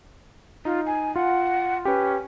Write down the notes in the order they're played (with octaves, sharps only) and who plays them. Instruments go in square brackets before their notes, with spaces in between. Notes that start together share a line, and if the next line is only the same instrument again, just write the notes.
[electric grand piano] D#4 [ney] F4
[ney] G#5
[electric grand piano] F4 [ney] F#5
[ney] C#4 [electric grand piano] G4 B4